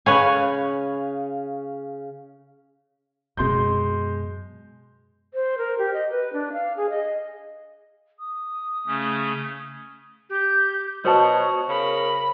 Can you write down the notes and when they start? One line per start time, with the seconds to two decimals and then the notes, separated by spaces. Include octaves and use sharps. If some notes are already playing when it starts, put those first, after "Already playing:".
0.06 C#3 B4 C#5 D#5 F5 G#5
3.37 F#2 B2 G#3 C6 G6
5.34 C5
5.58 A#4
5.78 G4
5.93 D#5
6.11 B4
6.33 D4
6.53 F5
6.77 G#4
6.90 D#5
8.19 D#6
8.87 C#3 A3 C#4
10.30 G4 G6
11.05 B2 F#4 C5 C#5 A5 D#6
11.69 C#3 A#4 B5